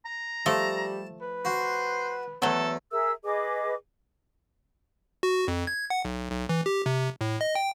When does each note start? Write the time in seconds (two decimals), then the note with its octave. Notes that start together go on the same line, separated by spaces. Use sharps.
0.05 A#5
0.46 F3 G3 A3 A5
1.21 B4
1.45 F#4 C5
2.42 E2 F#3 A3 A4
2.91 G#4 A#4 E5 E6
3.24 G#4 B4 D#5 D6
5.23 F#4
5.48 F2
5.67 G#6
5.90 F#5
6.05 B1
6.32 B1
6.49 E3
6.66 G4
6.86 C3
7.21 A2
7.41 D#5
7.55 G5